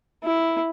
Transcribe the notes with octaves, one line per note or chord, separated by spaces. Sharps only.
E4